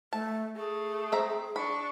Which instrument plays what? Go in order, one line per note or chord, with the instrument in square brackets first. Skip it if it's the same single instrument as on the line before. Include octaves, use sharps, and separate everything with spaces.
[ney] A3 [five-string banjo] A5
[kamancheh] A3 [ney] G#4
[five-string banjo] C4 E5 A#5
[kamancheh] D4 C#6 [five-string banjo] B5